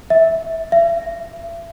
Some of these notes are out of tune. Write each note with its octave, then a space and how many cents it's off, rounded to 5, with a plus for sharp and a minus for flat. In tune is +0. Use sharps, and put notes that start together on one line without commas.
E5 -10
E5 +40